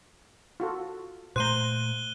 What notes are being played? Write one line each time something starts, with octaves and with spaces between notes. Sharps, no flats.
F4 F#4 A4
A#2 A3 C5 A#5 F#6 D#7 G7